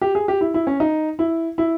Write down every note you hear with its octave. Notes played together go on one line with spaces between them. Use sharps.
G4
G#4
G4
E4
E4
C#4
D#4
E4
E4